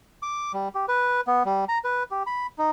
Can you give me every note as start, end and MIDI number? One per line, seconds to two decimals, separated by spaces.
0.23 0.52 86
0.54 0.68 55
0.75 0.86 67
0.88 1.21 71
1.27 1.43 59
1.45 1.65 55
1.69 1.78 82
1.84 2.03 71
2.11 2.23 67
2.27 2.47 83
2.58 2.71 63